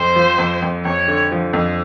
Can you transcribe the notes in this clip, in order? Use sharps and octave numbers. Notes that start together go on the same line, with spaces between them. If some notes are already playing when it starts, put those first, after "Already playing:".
Already playing: F2 C5
F3
F2
F2
F2 C#5
D3
F3
F2